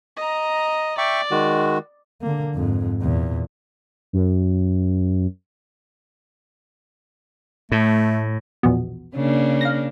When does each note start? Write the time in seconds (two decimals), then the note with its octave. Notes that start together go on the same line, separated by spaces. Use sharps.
0.17 D#5 A#5
0.98 D5 E5 G5 C#6
1.31 D#3 G#3 F#4
2.22 D3 A#3
2.55 F2 G#2
3.02 E2 A#2
4.13 F#2
7.72 A2 A3
8.63 A#1 E2 B2
9.15 C#3 A#3 D4
9.61 F5 A#6